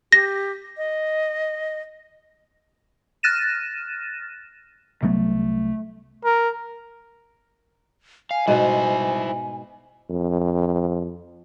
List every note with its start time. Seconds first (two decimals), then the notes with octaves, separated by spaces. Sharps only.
0.12 G4 A#6
0.77 D#5
3.23 F6 F#6 A6 A#6 D#7 E7
5.03 C2 F#3 A3 B3
6.24 A#4
8.31 F5 G#5
8.47 G#2 B2 E4 C5
10.10 F2